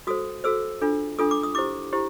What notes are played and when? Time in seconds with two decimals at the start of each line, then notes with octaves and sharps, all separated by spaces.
0.07 F#4 A4 C5 D#6
0.44 F#4 A4 C5 E6
0.82 D4 F4 A4
1.19 D4 F4 A4 D#6
1.31 D6
1.43 D#6
1.55 E4 G4 C5 D6
1.93 E4 G4 C5